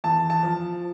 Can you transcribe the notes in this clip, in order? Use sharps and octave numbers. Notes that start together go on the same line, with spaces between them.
E2 A5
A5
F3